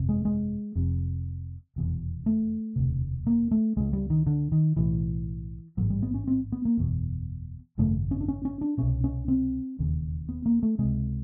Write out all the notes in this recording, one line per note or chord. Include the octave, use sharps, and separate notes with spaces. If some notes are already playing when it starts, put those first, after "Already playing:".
Already playing: G1 F2 C3
G#3
G#3
F1 F2 C3
F1 E2 B2
A3
E1 D2 C3
A#3
A3
C#2 C#3 G#3
G3
D#3
D3
D#3
B1 A2 E3
A1 G#2 F#3
G3
B3
C#4
C4
B3
A#3
F#1 E2 B2
G#1 F#2 C#3 A3
C#4
D4
C#4
C#4
D4
C2 B2 C#4
C#4
C4
E1 D#2 C#3
B3
A#3
A3
C#2 C3 G#3